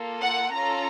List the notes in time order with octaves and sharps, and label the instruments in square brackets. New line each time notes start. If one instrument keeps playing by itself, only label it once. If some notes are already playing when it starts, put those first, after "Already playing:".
Already playing: [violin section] A#3 F4 A4
F#5
C#4 F4 A4 A#5